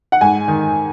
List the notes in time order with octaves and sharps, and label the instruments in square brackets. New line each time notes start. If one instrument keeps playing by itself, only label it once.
[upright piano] F#5
G#2 G#5
D#3